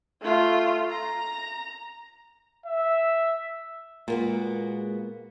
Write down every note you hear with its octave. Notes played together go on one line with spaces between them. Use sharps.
A3 F4
A#5
E5
A#2 G#3 A#3 B3 F#4